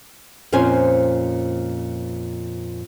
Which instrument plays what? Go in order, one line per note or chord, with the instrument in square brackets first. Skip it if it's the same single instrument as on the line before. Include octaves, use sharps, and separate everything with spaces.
[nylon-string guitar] F2 A#2 C#4 C5 G#5